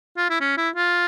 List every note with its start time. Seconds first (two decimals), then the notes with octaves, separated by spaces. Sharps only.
0.17 F4
0.30 E4
0.41 C#4
0.57 E4
0.75 F4